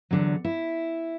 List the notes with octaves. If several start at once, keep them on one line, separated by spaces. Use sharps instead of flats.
E2 D3 F#3
E4